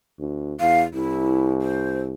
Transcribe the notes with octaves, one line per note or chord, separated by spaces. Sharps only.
D2
E2 F5
C2 E4
C5